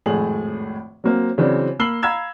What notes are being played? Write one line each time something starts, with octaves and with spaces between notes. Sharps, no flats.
G#1 F2 A2 A3 G#4 F#7
F#3 A#3 C4
C#3 E3 F#3 C4 D4
A#3 B5 E6 C7 F#7 G7
F5 A#5 B5 E6 G#6 E7